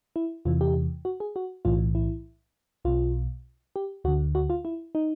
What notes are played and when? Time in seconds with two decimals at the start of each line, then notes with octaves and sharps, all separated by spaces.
0.16 E4
0.45 E2 C3 E3 F4
0.61 G4
1.05 F#4
1.20 G#4
1.36 F#4
1.65 B1 A2 E3 F4
1.95 E4
2.85 B1 B2 F4
3.76 G4
4.04 D2 D3 F#4
4.35 F#4
4.50 F4
4.65 E4
4.95 D#4